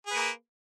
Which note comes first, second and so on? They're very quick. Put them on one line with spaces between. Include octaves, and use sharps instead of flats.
G#4 B4 A#3